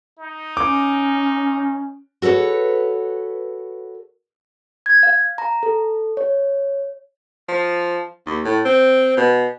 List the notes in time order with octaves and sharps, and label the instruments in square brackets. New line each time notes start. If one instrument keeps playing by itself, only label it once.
[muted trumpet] D#4
[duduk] C#4 [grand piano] D6
[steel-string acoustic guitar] F#4 A4 B4 C#5
[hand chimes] G#6
F5
A#5
A4
C#5
[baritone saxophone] F3
D#2
A2
C4
B2